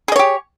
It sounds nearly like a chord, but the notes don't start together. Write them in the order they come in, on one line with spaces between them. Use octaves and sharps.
G#4 D#5 C#5 G4